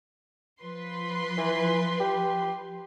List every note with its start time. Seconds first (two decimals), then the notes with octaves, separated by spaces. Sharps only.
0.61 F3 B4 C6
1.37 E3
2.00 G4